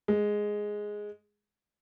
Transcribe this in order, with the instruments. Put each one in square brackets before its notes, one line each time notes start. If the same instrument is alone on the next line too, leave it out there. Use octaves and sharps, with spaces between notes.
[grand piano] G#3